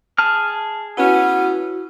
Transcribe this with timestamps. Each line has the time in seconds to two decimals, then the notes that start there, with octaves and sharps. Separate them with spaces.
0.18 G#4 A5 F6
0.97 B3 C#4 E4 F#4